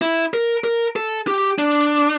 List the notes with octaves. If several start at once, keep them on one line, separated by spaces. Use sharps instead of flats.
E4
A#4
A#4
A4
G4
D4